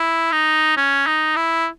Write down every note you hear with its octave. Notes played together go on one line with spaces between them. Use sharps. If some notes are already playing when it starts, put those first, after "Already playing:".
Already playing: E4
D#4
C#4
D#4
E4